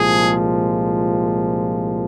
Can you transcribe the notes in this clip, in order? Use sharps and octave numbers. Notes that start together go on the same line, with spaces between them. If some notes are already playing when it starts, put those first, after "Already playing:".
Already playing: C2 A#2 F3 G#3 G#4